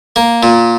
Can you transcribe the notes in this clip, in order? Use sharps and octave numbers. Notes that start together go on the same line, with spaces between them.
A#3
A#2